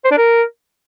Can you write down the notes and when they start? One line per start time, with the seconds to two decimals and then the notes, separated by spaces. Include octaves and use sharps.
0.04 C5
0.11 D4
0.17 A#4